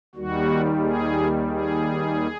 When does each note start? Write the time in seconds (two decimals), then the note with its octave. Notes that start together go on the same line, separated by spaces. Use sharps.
0.15 D#2 D#3 G3 F#4
0.81 G#4
1.48 G#4